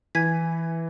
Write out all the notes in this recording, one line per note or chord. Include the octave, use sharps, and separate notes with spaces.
E3 G#5 G#6 B6